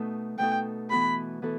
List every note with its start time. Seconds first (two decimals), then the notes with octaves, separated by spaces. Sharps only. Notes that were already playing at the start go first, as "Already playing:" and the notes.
Already playing: B2 A3 D#4 A4
0.39 B2 A3 D#4 A4 G5
0.90 E3 B3 F#4 A4 B5
1.42 E3 B3 F#4 A4